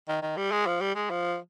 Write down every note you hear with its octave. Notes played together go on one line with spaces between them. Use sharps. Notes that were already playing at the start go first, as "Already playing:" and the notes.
D#3
D#3
G3
G#3
F3
G3
G#3
F3